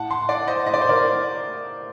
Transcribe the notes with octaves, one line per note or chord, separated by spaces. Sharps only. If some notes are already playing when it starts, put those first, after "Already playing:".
Already playing: A2 F#5 A5
A5 C6
D5 F#5
C5 D#5
A2 D#5
D5
C5
A#4 D5